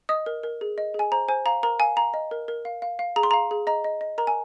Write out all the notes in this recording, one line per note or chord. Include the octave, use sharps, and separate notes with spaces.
D#5 D#6
A#4
A#4
G#4
D#5
G#4 G#5
C5 A#5
C5 G#5
F5 A#5
A#4 A#5
F5 G#5
F5 A#5
D#5
A#4
A#4
F5
F5
F5
G#4 A#5
C6
F5 A#5
G#4
D#5 A#5
D#5
D#5
A#4 A#5
G#5